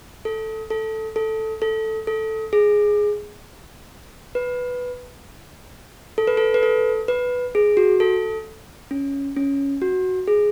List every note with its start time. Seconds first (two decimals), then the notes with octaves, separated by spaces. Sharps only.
0.25 A4
0.70 A4
1.16 A4
1.62 A4
2.07 A4
2.53 G#4
4.35 B4
6.18 A4
6.27 B4
6.37 A4
6.54 B4
6.63 A4
7.08 B4
7.55 G#4
7.77 F#4
8.00 A4
8.91 C#4
9.37 C#4
9.82 F#4
10.27 G#4